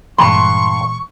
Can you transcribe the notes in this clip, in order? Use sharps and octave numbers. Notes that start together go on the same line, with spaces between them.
G2 A#2 E3 G#3 C6 C#6